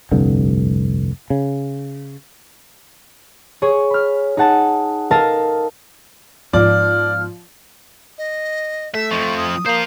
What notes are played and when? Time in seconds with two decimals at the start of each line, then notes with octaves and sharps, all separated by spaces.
0.11 F1 C2 G2 D3
1.30 C#3
3.62 G#4 C#5
3.90 B5 F6
4.37 D#4 G#4 F#5 A5
5.11 A4 A#4 D#5 F5 A5 A#5
6.53 G#2 F3 B3 D5 F6
8.18 D#5
8.94 A3 E5
9.11 F2 F3 C#6
9.37 D#6
9.66 A#3 C5 F5